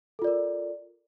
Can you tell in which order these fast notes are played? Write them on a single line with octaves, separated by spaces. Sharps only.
A4 F4 D5 A#4